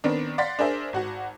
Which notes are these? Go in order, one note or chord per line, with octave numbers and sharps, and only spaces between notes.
D#3 B3 C4 D4
D5 F5 F#5 C6 A6 B6
D4 G#4 A#4 C5 E5
G#1 F#4 F#5